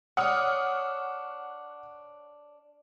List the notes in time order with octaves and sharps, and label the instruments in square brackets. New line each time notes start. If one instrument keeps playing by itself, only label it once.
[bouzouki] D4 C#5 [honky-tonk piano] F#5 D#6 F6